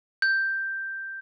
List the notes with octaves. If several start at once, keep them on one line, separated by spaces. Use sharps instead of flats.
G6